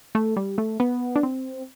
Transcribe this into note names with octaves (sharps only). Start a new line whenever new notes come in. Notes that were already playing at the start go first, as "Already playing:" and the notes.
A3
G3
A3
B3
D4
C4